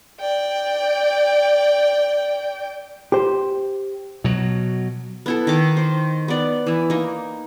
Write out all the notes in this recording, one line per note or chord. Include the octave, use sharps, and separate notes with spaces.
D5 G5
G4 C5
B2 F#3
B3 E4 A4
D#3 A#4 D6
C5
B3 D5
E3 E4
A#3 D#4